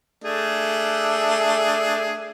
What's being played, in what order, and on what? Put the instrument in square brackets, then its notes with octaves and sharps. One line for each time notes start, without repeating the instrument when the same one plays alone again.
[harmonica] A3 D4 G#4